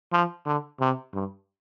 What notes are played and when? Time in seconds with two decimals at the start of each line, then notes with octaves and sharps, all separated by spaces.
0.12 F3
0.46 D3
0.80 C3
1.13 G2